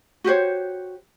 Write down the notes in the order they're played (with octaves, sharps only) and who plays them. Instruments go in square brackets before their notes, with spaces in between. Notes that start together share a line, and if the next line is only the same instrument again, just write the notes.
[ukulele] F#4 G4 C5 C#5